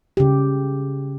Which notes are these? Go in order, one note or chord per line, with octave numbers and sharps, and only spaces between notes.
C#3 G4